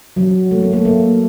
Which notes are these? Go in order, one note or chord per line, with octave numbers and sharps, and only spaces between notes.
F#3
A3
A#3
A3
A#3